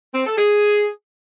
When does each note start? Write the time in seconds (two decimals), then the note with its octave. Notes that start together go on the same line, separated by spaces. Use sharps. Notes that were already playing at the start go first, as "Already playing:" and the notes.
0.14 C4
0.25 A4
0.37 G#4